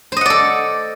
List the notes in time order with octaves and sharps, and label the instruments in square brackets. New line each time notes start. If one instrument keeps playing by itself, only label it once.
[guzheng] C5
D#5
F#5
D5
A4